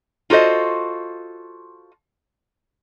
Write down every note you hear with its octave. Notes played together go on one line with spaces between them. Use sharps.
F4 F#4 A4 C5 D#5